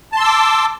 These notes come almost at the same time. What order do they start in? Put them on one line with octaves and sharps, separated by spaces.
A5 C6 E6 D6